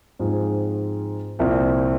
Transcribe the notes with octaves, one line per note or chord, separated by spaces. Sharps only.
G#2 F3 C4 F4 G#4
C2 A#2 F3 C4